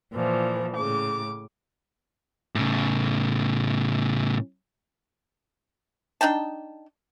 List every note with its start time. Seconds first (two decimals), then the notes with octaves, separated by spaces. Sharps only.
0.14 A#2 E3 F3
0.75 A2 C#3 D6
2.55 A2 C#3
6.21 D4 D#4 G5 A5